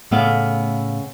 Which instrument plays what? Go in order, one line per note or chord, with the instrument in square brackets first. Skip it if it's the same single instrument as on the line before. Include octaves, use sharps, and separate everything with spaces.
[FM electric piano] A2 A3 [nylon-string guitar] C#3 B3 F5